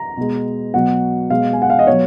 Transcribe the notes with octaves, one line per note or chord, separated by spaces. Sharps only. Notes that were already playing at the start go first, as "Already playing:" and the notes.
Already playing: A#5
B2 G#3
B2 F#3 F#5
B2 G#3 F5
G#5
F#5
F5
D#5
B2 F#3 C#5